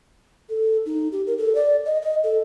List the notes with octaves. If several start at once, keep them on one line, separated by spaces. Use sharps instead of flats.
A4
D#4
G4
A#4
A4
D5
D#5
D#5
A4